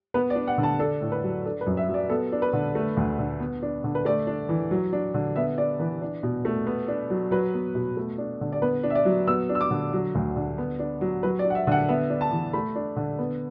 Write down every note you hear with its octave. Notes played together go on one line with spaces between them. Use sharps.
B3 B4
D5
D4
F#5
D3
A5
D4 A4
A2
B4
F#3
D4 A4
B4
F#2
E5
F#3
D5
B3 A4
D4
B4
D3
A3
D2
D3
B3
D4
D3
B4
A3 D5
D4
E3
F#3
D4
D3
B3 E5
D4 D5
E3 B4
D4
B2
A3
B3
D4
F#3
F#3 B4
B3
B2
A3
D4
D3
D5
B3 B4
D4
E5
D5
F#3
B3 E6
D4
E6
D6
D3
F#3
D2
D3
B3
D4
F#3
F#3 B4
D5
D4
F#5
E5
D3 F#5
B3 E5
D4
A5
E3
A3 B5
D4
D3
B3